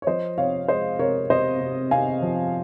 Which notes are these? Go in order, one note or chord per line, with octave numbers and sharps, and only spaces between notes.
C#5
F3 C5 D#5
C3 C#5 F5
G#3 C5 D#5
C3 A#4 C#5
C3 C5 D#5
C3
C3 F5 G#5
F3